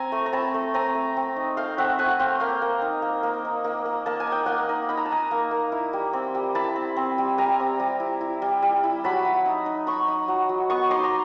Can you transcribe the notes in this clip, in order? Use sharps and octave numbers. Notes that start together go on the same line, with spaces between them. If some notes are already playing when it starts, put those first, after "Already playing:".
Already playing: C4 G#5 A#5
A3
A#5
C4 A5 B5
A3
C4 G#5 A#5
A3
C4
D#4
A3 F5 G5
C4 E5 F#5
A3 F#5 G#5
C4 F5 G5
A#3 F5 G5
A#3
D#4
A#3
A#3
D#4
A#3
A#3
A#3 A5
G#5
D#4
G5
A#3 F#5 G#5
D#4
D#4 B5
A#5
A5
D#4 G#5 A#5
A#3
A#3
E4
G3
C4
G3
E4 A5 B5
C4
C4
G3
G3 G#5 A#5
C4
G3
E4
E4
G3
G3
E4
F#3 A5 B5
F#3
D#4
D#4
D#4 B5 C#6
D#4
F#3
F#3
B3 C#6 D#6
D#4 C6 D6
A#5